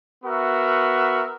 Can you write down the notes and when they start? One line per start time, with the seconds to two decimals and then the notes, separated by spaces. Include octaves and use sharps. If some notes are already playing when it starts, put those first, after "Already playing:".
0.22 B3 F#4 A#4 E5